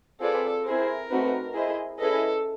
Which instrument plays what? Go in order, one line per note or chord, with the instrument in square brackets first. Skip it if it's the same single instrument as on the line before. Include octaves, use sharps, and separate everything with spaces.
[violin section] C4 F4 G#4 B4 D5 [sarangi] A4
[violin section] C4 E4 G#4 C5 [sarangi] A#4
[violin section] A3 C4 D#4 F#4 B4
E4 G#4 C5 D#5
[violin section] C#4 E4 G#4 B4 D#5 [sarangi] A4